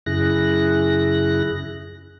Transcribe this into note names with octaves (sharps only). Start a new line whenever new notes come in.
F#2 C#3 E4 G#4 F#6 A#6